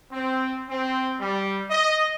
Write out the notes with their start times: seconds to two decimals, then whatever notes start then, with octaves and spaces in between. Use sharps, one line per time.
0.11 C4
0.69 C4
1.21 G3
1.71 D#5